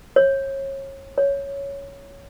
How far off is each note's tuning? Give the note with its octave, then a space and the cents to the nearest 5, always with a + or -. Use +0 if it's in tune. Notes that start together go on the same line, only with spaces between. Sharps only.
C#5 -30
C#5 +5